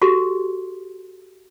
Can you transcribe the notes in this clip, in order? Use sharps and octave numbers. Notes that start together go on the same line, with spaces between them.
F#4 G4 A4 C6